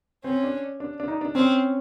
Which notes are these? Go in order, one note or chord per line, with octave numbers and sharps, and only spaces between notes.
C4 C#4
D4
D4
D4
D#4
D4
C4 C#4